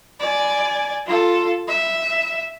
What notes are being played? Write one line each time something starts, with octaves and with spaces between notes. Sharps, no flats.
D5 G#5
F4 A4
E5